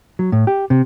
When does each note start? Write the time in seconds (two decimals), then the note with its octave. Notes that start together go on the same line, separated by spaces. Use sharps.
0.19 F#3
0.32 A2
0.47 G4
0.70 C3